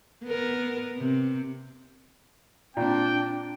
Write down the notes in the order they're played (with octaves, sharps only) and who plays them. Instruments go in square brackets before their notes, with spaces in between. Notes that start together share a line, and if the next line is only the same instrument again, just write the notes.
[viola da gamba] B3 A#4
C3
[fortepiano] A#2 [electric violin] C4 D4 [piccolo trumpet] G5